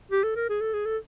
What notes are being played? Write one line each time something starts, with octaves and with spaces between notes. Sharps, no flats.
G4
A4
A#4
G#4
A4
G#4
A4